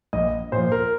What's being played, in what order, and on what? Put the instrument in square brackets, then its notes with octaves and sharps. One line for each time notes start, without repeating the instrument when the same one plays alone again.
[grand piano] A#1 D#5
A#2 F3 C5
A#4